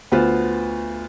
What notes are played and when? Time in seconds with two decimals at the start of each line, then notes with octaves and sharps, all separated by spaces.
0.12 D2 B3 F4 C5